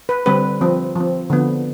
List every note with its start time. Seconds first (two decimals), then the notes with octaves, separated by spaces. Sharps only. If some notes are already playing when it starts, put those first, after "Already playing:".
0.09 B4
0.26 D3 G3 C4 B4
0.61 F3 C4
0.96 F3 C4
1.30 D3 F3 B3